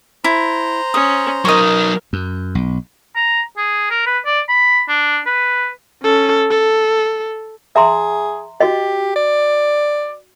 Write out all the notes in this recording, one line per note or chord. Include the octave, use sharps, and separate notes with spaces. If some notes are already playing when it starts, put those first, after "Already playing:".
E4 C5 A#5
C#4 D#6
F#3 D#4 A#4 D#5 C#6
F#2
B1
A#5
G#4
A#4
B4
D5
B5
D4
B4
C#4 A4
A4
G#4 E5 A#5 C6
F#4 G4 D#5
D5